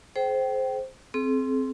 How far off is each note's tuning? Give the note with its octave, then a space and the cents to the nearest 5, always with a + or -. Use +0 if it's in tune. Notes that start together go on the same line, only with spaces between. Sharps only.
G#4 +40 C5 +0 G5 -20
C4 +0 G#4 +45